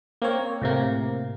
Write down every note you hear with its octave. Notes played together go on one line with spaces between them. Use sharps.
A#3 C4 C#5
A2 C3 A#3